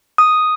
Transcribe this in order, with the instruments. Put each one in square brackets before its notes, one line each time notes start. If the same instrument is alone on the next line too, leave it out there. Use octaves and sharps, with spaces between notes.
[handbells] D#6